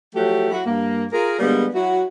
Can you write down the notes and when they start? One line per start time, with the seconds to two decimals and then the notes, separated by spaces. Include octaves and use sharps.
0.15 F3 F#3 A3 F#4 G4
0.51 F#3 E4 F#4
0.65 G2 A#3
1.12 F4 G#4 A#4
1.38 D3 G3 G#3 A#3 B3
1.74 F#3 E4 F#4